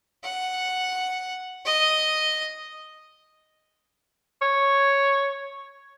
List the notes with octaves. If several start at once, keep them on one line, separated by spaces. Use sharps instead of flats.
F#5
D#5
C#5